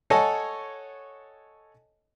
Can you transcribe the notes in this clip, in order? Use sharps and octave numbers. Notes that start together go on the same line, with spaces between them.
A4 C#5 D#5 F#5 G#5 A5